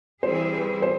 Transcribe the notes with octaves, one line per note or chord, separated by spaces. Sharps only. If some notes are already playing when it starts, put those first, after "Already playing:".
E3 G3 C4 E4 G#4 C5
B4
C5